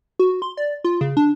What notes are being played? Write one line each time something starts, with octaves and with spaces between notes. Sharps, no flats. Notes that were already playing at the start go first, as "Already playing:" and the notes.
F#4
C6
D5
F4
C#3
D4